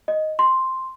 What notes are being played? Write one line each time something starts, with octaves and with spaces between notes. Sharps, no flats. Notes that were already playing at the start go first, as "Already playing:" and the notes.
D#5
C6